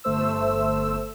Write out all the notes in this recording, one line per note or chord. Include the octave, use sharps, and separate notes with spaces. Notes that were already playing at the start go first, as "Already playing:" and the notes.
G1 A3 C5 E6